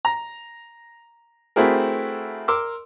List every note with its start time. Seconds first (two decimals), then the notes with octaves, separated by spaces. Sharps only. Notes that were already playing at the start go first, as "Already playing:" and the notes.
0.05 A#5
1.56 A3 C4 E4 F#4 G#4 A#4
2.48 A#4 C6 D6 E6